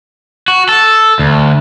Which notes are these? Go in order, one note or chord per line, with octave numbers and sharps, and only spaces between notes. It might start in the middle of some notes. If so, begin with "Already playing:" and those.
F#4
A4
D2